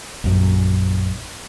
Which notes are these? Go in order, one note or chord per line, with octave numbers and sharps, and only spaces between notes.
A#1 F#2